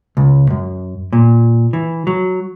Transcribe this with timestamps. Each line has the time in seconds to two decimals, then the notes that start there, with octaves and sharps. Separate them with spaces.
0.17 C#2
0.50 F#2
1.13 A#2
1.73 E3
2.07 F#3